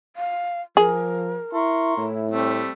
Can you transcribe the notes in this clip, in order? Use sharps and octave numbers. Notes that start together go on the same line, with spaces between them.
F5
F3 G#4 A#4
E4 A#4 C6 C#6
A2 E4
G3 A3 C4